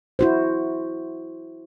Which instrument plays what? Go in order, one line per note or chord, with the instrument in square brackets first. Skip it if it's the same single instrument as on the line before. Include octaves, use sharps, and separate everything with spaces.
[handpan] E4 F#4 C5